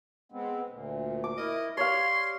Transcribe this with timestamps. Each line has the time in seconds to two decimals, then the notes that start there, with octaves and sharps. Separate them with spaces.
0.32 G#3 B3 C4
0.70 D2 A#2
1.24 D6
1.38 E4 A#4 D#5
1.77 G4 C#5 D5 F5 C6